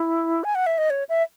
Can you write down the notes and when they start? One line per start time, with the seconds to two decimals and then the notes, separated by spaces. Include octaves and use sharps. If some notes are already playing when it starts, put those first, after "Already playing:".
Already playing: E4
0.44 G#5
0.55 F#5
0.66 E5
0.78 D#5
0.90 C#5
1.09 E5